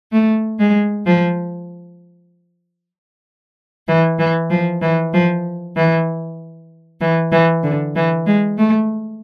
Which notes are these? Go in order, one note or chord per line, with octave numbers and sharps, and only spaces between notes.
A3
G#3
F3
E3
E3
F3
E3
F3
E3
E3
E3
D3
E3
G#3
A3